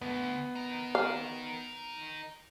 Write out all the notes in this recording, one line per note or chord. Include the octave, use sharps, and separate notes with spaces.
D2 B3
D#4 A#4
F5